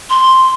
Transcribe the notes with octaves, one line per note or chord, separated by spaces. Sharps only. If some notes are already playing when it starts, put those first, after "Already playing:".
C6